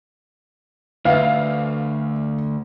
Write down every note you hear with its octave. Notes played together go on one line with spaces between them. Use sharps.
D2 B4 E5 F5